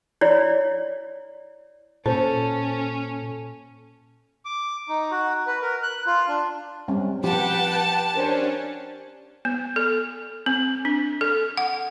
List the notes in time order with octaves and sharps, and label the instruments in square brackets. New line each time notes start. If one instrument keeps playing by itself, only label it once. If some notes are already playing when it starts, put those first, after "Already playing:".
[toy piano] E4 C#5 D5
[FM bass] A#2 [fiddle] C#4 [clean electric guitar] A4 [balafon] C5
[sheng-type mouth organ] D6
D#4
F#4
B4
A#4
F#6
F4
D4
[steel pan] G3 C4 C#4
[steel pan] F3 [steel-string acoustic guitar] G4 [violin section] B4 F#5 G5 [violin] A5
[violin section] C#4 D4 C#5 [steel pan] A#4 C5
[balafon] B3
A4
C4
D4
A4
F#5